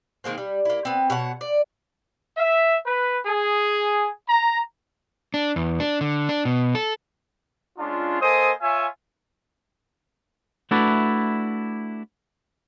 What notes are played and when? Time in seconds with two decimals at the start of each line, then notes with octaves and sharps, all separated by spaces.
0.24 D#3 G#3 A#3 C4
0.38 G3
0.65 A#3 E4
0.85 B3 C4
1.10 B2 C#5 F#5
1.41 D5
2.37 E5
2.84 B4
3.26 G#4
4.28 A#5
5.34 D4
5.56 E2
5.80 D4
6.01 D3
6.29 D4
6.45 B2
6.75 A4
7.79 G#3 C#4 D4 F4
8.22 A#3 A4 C5 D#5 G#5 D#6
8.61 F4 C#5 E5 G#5
10.71 A3 D4 E4 F#4 B4 D5